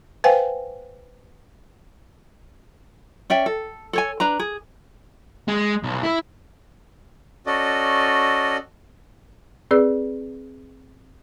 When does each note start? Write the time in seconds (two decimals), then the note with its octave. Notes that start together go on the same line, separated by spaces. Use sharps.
0.24 B4 C5 F5 G5 G#5
3.30 C#4 D5 E5 G5
3.46 A4
3.93 A4 C#5 G#5
4.20 D4 B4 A#5
4.39 G#4
5.48 G#3
5.84 B1
6.03 E4
7.46 C#4 F#4 A4 D5 D#5
9.71 C4 G#4 B4 D5 E6